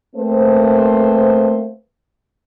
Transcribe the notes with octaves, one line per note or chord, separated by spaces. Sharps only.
A3 A#3 C4 B4 C5